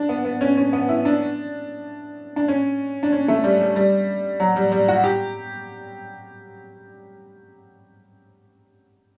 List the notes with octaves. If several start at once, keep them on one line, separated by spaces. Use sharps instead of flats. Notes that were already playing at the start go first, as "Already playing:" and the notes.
Already playing: D4
B3
B3
C#4
C#4
B3
E4
D4
D4
C#4
D4
C#4
A3
G3
G3
G3
F#3
G3
G3
F#4
G4